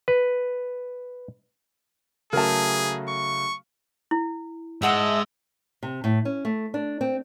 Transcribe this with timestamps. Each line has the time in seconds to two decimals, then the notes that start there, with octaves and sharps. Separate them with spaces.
0.08 B4
2.33 C#3 F#3 A3 G#4 A#4 A5
3.09 C#6
4.11 E4
4.82 G#2 G#3 D#5 E5 F#5 A5 E6
5.83 C3
6.04 A2
6.25 C#4
6.45 A3
6.74 D4
7.01 C4